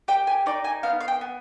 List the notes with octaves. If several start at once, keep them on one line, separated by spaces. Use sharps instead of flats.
G4 G5
G#5
D#4 D5
G#5
B3 F5
F5
G5
B3